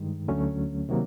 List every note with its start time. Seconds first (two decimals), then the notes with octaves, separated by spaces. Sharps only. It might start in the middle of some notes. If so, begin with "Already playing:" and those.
Already playing: G2 D#3 G#3
0.28 D2 D3 F#3 A3 C#4
0.89 C3 D#3 F#3 A#3